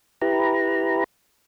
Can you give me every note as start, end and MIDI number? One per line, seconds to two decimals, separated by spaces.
0.22 1.04 64
0.22 1.04 67
0.22 1.04 71
0.22 1.04 82